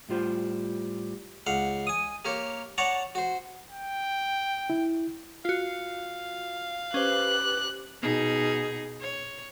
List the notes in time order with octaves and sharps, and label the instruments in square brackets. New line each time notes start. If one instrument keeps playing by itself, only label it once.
[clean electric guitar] A2 G3 F4 C5 C6
[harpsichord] C#2 F5 F#5
G#5 D#6
A#3 G4 A#4 C#5
C#5 D5 F#5 A5 A#5 C#6
F#4 C5
[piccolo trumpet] G5
[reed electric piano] E4
[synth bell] F4 F#4 [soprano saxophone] F5
[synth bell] C#4 C5 [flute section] G4 B4 D6 [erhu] F#6
[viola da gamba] B2 D#4 G#4
C#5